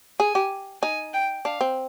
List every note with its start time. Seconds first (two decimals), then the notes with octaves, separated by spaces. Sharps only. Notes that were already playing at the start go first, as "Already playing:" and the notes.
0.20 G#4 G#5
0.35 G4
0.82 D#4 G#5
1.14 G5
1.45 D4 F5
1.61 C4